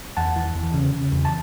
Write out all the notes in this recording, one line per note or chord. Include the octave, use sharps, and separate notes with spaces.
E2 F#5 A5
E3
E2
C#3
C#3
E2
A5